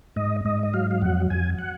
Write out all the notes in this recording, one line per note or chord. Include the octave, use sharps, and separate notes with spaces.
G#2 D#5
G#2 D#5
D#5
F#3 F5
F5
F2 F#5
F2 G#5
F#5